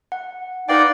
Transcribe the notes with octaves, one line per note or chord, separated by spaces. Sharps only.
F#5
D#4 B4 D5 F5 G5